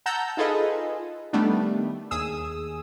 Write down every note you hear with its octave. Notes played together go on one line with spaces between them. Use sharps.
F#5 A5 A#5 E6 G6
D#4 F4 G#4 A4 B4 D#5
D#3 G3 A3 B3 D4
D#2 G#4 D#6 E6